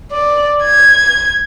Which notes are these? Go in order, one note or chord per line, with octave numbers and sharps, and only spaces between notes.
D5
G#6